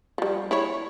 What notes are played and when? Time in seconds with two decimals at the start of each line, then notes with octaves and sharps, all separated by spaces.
0.18 F3 G3
0.51 E4 C#5